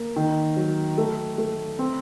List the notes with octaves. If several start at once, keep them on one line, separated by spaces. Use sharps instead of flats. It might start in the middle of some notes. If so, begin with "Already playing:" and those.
Already playing: A#3
D#3
F#3
A3
A3
C4